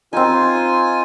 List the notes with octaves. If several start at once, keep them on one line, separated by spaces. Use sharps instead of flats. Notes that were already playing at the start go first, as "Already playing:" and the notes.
C4 D#4 F4 G#5